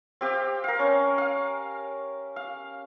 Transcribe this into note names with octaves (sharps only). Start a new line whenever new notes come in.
C4 G4 F5 D6
A#4 F5
C#4
F5
F5